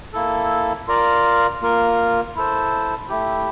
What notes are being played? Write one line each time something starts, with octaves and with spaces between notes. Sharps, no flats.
A#3 E4 A4
F4 A#4 D5 F5
A#3 F4 A#4
E4 A4 C5
A3 E4 G4